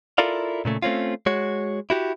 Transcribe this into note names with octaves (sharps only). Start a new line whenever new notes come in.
E4 F4 A4 A#4 D5 F5
A#2 C#3 A3
A3 C4 C#4 F4
G#3 F#4 C#5
E4 F#4 G4